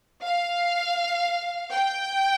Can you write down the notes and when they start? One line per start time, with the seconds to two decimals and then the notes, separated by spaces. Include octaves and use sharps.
0.23 F5
1.73 G5